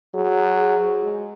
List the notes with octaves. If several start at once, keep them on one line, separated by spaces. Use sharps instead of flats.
F#3 G#4
F#5
G#4
C5
G#3 F#4